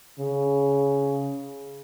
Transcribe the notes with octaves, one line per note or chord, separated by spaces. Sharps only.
C#3